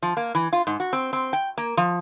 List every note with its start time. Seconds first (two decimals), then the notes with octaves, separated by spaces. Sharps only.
0.02 F3
0.17 A#3
0.35 E3
0.53 F4
0.67 G#2
0.80 F#4
0.93 C4
1.13 C4
1.33 G5
1.58 A#3
1.77 F3